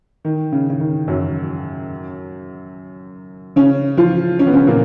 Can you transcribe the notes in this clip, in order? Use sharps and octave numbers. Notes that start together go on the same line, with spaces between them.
D#3
C#3
C#3
D#3
F#2 F#3
C#3 C#4
F3 F4
C#4
B3
C#3 C#4
A#2 A#3